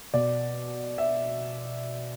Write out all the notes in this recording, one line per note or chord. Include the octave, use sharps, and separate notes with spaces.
B2 D5
E5